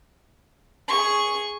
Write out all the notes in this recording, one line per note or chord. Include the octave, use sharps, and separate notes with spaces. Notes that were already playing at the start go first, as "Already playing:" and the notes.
G#4 C#6